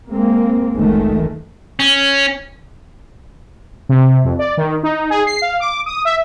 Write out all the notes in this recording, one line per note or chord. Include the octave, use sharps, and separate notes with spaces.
G#3 A#3 C4
F#1 C#2 F#2 D#3 G#3 A3
C#4
C3
F2
D5
D#3
D#4
G#4
C7
F5
D6
D#6
E5